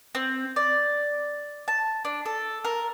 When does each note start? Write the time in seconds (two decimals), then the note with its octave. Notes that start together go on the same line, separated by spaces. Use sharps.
0.15 C4
0.56 D5
1.68 A5
2.05 D4
2.25 A4
2.65 A#4